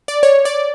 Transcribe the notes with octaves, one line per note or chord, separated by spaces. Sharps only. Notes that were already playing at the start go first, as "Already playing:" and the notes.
D5
C#5
D5